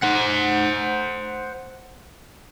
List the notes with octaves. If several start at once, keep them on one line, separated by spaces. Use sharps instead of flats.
C5 F#5